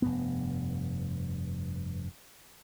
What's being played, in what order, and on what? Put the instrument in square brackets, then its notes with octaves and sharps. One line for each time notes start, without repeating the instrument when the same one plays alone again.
[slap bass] F1 G2 B3